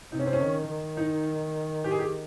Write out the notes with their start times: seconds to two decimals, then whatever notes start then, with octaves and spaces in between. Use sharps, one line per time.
0.12 C3 D#4
0.19 C#4
0.27 C4
0.33 C#4
0.40 D#3
0.69 D#3
0.97 D#4
1.84 G4
1.91 G#4
1.99 G4